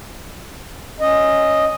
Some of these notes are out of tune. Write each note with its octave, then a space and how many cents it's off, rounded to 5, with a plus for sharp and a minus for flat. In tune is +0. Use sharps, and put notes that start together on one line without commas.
C#4 +0 D#5 +0